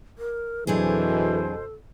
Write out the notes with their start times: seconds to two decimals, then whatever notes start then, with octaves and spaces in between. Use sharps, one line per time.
0.18 A#4
0.67 F2 B2 E3 F#3 D4 G#4 A4 C5